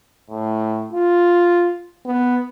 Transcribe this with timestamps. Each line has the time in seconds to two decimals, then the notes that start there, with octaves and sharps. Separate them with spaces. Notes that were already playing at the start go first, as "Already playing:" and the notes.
0.30 A2
0.93 F4
2.06 B3